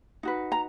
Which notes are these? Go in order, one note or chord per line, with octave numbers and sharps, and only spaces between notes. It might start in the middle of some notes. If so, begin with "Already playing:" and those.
D#4 F#4 B4
A#5